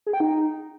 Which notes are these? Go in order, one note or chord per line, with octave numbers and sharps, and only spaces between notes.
G#4
G5
D#4